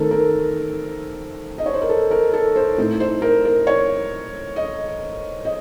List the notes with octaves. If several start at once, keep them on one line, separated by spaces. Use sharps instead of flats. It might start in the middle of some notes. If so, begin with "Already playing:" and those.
Already playing: D#3 A3 C4 A4 A#4
A#4
D#5
C#5
C5
A#4
A4
A#4
A4
C5
A2 A3 C4 D#4
C5
A#4
A#4
C#5
D#5
D#5